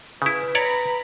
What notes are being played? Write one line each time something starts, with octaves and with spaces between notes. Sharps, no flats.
C#3 E4 B4
C#5 D5 A#5 B5